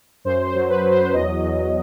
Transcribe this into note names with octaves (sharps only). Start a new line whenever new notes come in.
F#2 C5
C5
F#3
B4
F#3
C5
E2 D#5
E2